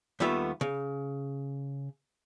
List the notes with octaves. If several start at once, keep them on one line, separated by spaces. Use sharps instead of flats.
D#2 G3 A3 B3 F4 E5
C#3